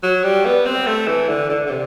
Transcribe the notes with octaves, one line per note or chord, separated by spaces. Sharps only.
F#3
G3
B3
C4
A3
E3
D3
D3
D3
C3